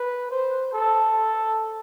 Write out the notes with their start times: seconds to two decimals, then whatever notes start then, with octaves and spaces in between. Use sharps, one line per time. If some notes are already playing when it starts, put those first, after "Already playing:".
Already playing: B4
0.31 C5
0.73 A4